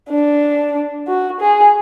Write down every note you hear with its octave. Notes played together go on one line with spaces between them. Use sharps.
D4
F#4
G#4